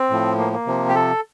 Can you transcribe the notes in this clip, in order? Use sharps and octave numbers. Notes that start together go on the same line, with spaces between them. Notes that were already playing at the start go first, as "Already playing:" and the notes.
Already playing: C4
A2 F3
A#3
A#3
C3 F3
G4
A4